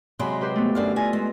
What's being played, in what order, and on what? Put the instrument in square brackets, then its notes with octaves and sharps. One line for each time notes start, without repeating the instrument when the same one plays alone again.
[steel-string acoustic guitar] C3 F#3 G#3 [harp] B5 C6
[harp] G4 B4 C5
A3 B3
[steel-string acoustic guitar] F#2 D3 F5
[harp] E4 F4 D#5 [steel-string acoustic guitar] G#5
[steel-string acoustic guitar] G#3